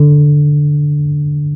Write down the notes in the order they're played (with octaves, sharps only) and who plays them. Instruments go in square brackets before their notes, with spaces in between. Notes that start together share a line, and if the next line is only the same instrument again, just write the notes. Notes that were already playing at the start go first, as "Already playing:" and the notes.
Already playing: [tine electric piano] D3